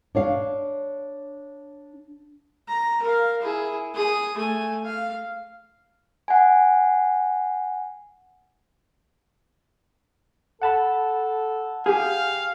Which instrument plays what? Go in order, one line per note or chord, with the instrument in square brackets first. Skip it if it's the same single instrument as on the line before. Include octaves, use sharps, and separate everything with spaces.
[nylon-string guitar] D4 C#5 F5
[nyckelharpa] A#5
A#4 F5
E4 G#4
G#4 D#6
A3 G#5
F5
[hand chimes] F#5 G#5
[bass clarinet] A4 [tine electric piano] F#5 A5 B5
[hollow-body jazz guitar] G4 G#4 [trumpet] F5